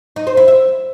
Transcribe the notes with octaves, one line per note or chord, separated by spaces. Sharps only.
D#4
C5
E4
E5